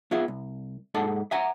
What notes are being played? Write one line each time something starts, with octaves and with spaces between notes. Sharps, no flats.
B3 F4 G#4 E5
C2
G#2 G#4 A4 F#5 A5
E5 F#5 G#5 A#5